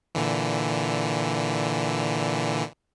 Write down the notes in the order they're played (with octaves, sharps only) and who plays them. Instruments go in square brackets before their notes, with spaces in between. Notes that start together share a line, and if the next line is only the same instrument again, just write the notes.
[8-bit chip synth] A#2 D3 E3